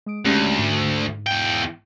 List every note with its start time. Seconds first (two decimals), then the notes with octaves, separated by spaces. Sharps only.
0.06 G#3 D#6 D7
0.25 D2 G#3 C#4 G4
0.59 G#2
1.26 E2 G5